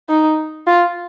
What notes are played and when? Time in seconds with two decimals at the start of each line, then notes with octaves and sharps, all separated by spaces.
0.09 D#4
0.67 F4